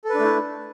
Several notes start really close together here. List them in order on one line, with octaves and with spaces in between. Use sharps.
A4 B4 D4 A3 E4